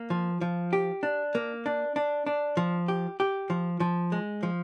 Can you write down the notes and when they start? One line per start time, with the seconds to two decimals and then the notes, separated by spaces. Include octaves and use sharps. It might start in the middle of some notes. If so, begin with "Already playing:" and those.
Already playing: A#3
0.10 F3
0.41 F3
0.73 G4
1.03 D4
1.35 A#3
1.66 D4
1.96 D4
2.26 D4
2.57 F3
2.88 G4
3.20 G4
3.50 F3
3.80 F3
4.12 G#3
4.43 F3